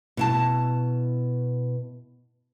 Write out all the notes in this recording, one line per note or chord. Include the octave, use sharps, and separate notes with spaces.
B2 E4 A5